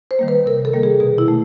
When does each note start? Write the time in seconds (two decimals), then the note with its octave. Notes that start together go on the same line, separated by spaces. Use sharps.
0.11 C5
0.19 D#3 G3 A#3
0.28 B4
0.46 C3 A#4
0.65 A4
0.74 D#3 G3 A#3
0.83 G#4
1.00 B2 G#4
1.18 E4
1.28 A3